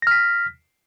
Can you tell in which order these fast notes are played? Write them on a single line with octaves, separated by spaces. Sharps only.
A#6 F6 B6